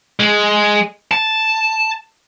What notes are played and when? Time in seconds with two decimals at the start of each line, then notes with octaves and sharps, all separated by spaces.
0.20 G#3
1.11 A5